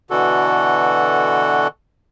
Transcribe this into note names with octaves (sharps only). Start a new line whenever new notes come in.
B2 D3 E3 F#4 A4